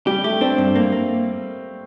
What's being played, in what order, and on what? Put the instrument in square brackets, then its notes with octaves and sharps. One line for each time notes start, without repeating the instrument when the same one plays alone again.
[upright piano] G3 [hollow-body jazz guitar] G4
[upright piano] A3 [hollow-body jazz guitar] G4
[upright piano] C4 [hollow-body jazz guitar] D4
[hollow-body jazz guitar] G2
A#3
A#3